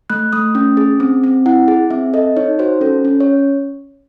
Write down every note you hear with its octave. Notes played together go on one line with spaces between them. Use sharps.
A3 F#6
A3 D#6
C#4
G#4
C4
C4
E4 F#5
G#4
C4 E5
A4 D#5
D#4 C#5
F#4 C5
C#4 A4
C#4
C#5